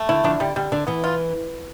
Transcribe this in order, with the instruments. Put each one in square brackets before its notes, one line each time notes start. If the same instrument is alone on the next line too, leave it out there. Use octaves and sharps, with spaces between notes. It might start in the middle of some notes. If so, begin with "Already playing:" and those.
Already playing: [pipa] A3
[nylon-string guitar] D3 [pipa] E4
[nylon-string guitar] D3 F3 [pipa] D4
[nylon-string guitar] D3 [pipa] G3
[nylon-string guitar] D3 [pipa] G3
[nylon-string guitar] D3 [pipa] D4
[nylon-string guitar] E3 [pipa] B3
[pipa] F4